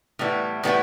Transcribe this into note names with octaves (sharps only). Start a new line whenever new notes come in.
A2 E3 G3 B3 E4
A2 E3 G3 B3 E4